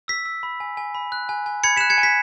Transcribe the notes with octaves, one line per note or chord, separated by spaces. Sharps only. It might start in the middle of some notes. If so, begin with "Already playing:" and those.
E6 B6
E6
B5
G#5
G#5
B5
F#6
G#5
G#5
B5 G#6 C#7
F#6 B6 E7
G#6 C#7
G#5
B6